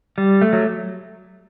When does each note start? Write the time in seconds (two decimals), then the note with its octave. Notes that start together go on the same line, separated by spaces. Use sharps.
0.18 G3
0.41 A3
0.53 F#3